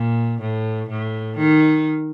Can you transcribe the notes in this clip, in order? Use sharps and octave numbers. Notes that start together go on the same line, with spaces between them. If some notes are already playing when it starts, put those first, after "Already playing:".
Already playing: A#2
A2
A2
D#3